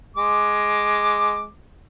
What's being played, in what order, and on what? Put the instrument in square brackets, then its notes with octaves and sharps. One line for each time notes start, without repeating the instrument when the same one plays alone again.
[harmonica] G#3 D6